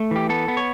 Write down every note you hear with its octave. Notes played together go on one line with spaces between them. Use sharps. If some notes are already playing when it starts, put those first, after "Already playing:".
Already playing: A3
E3 G4
B3 A4
B3
C#5